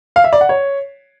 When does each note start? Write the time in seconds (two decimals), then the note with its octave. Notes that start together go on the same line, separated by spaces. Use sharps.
0.16 F5
0.24 E5
0.33 D5
0.41 F#5
0.49 C#5